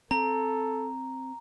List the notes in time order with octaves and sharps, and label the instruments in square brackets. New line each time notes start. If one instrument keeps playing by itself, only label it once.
[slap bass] C4 [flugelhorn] A4 [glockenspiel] A#5